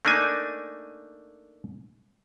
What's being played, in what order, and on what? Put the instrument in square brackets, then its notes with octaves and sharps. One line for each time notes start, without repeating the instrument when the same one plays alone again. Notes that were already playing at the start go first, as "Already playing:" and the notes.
[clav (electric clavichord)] A3 A#3 D4 D#4 G#5